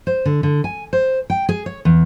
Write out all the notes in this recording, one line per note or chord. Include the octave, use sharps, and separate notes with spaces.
C5
D3
D3
G#5
C5
G5
G#4
C#5
E2